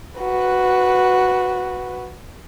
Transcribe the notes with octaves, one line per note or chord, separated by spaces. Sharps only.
F#4 B4